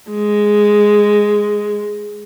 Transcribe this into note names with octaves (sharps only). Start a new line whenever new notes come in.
G#3